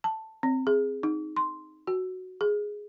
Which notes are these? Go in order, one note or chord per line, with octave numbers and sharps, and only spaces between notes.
A5
C4
G#4
D#4
C6
F#4
G#4